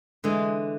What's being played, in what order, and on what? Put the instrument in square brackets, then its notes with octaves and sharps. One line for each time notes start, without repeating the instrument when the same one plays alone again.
[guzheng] D3 E3 [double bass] G#3